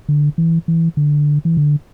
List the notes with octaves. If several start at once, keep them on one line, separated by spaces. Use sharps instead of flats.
D3
E3
E3
D3
E3
D3